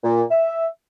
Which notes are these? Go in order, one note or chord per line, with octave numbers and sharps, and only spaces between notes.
A#2
E5